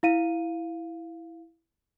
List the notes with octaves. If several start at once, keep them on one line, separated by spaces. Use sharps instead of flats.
E4 F5 D#7